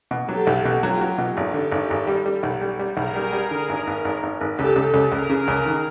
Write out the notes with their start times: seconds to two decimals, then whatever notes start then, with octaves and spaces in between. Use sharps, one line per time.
0.11 B2
0.29 F#3 G4 A4
0.47 B1
0.65 B2
0.83 F#3 F4 G4
1.01 F#3
1.18 B2
1.36 G#1 G4 A4
1.54 D3
1.71 G#1
1.90 G#1
2.07 G3
2.26 G3
2.43 B1
2.61 G3
2.79 G3
2.97 B1 G#4 A#4
3.15 G3
3.32 G3
3.51 D3
3.69 G#1
3.87 G#1
4.05 G#1
4.23 G#1
4.41 G#1
4.58 C#2 G4 A4
4.76 C#2
4.94 C#2
5.11 C#2 G#4 A#4
5.30 C#3
5.48 C#2
5.65 D#3